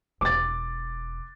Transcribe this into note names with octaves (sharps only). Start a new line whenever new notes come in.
E1 D6 A6